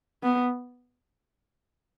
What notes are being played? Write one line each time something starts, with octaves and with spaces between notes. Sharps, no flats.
B3